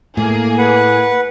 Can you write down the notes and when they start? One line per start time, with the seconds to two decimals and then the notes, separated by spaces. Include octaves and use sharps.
0.17 A2 A3 A#3 G#4
0.58 B4 F#5